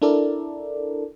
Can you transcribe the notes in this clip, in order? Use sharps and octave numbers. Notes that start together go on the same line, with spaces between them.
D4 E4 A4 A#4 D5